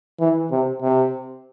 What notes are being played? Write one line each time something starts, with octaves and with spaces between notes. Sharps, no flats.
E3
C3
C3